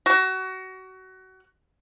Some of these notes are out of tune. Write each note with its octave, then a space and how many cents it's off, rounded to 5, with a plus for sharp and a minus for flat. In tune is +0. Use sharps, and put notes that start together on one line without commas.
F#4 +25